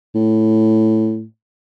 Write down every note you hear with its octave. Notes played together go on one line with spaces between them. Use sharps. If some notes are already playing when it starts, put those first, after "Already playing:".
A2